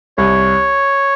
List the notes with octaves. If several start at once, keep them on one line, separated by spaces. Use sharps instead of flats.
C2 C#5